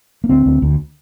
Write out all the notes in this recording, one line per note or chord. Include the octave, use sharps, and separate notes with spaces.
A#3
D2 C4
D2
D2